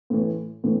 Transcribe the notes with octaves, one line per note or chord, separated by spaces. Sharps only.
A2 E3
A2 E3